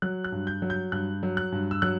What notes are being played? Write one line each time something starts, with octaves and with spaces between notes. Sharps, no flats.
F#3 F#6
F#6
G2
G6
F#3
G6
G2 F#6
F#3
F#6
G2
E6
F#3 F#6